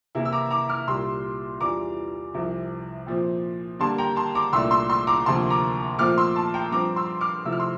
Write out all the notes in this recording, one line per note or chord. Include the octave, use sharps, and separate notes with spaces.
C3 E3 A#3 E4
E6
A#5 D6
A#5 D6
D6 F6
C2 A#2 G3 C6 E6
E2 E3 G3 D4 F4 A#5 D6
C2 C3 F3
A#2 F3 C4
D3 G3 A#3 A5 C6
G5 A#5
A5 C6
A#5 D6
C2 A#2 A3 D4 C6 E6
C6 E6
C6 E6
A#5 D6
D2 C3 F3 A#3 A5 C6
A#5 D6
A#2 F3 A3 C4 D6 F6
C6 E6
A5 C6
G5 A#5
G2 F3 C4 A#5 D6
C6 E6
D6 F6
C3 F3 A3 E4 E6
F6
C6 E6